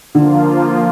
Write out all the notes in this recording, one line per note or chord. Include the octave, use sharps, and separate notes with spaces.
D3 F3 A#3 F4